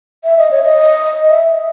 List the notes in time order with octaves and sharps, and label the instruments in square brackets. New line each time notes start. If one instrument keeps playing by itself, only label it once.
[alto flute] E5
D#5
C#5
D#5
E5